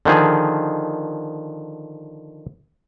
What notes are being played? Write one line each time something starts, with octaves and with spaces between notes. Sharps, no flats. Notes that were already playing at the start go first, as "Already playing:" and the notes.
D3 D#3 F3 G#4